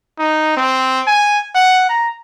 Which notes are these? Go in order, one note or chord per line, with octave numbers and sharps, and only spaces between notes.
D#4
C4
G#5
F#5
A#5